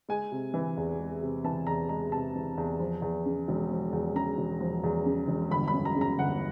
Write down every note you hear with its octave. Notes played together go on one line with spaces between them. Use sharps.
G#3 G#5
C3
E3
E2
G#3
C3
E3 A5
E2 A#5
G#3 A#5
C3 A5
E3
E2
F3
E2
C#3
E1
F3
E2
C#3 A#5
E1
F3
E2
C#3
E1
G1 B5
B5
F#2
A#5
C#3
A#5
G1 F#5